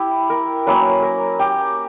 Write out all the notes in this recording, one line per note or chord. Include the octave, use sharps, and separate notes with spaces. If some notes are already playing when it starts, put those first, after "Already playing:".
Already playing: E4 G4
A#4
F#3 A#3 C#4 B4
A#4
G4